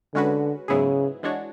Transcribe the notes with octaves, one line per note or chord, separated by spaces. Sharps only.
D3 G#3 C#4 F#4 B4
G#2 C#3 F#3 B3 E4 G#4
E3 G#3 D4 F#4 C#5